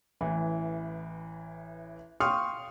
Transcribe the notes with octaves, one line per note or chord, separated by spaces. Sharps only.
A1 E3
F5 G5 C6 C#6 D#6 F6